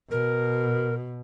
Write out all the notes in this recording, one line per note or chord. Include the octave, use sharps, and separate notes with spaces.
B2 A#4